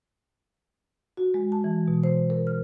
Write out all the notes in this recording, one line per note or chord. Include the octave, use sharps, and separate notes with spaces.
F#4
G#3
A5
E3
B2
C5
A#4
F6